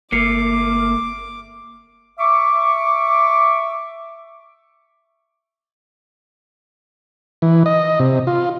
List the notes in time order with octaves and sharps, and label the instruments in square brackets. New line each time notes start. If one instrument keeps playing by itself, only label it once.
[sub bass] G1 [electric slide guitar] A3 A#3 [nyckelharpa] D6 [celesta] C7 C#7
[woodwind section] E5 C#6 D6
[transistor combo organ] E3
D#5
C3
F4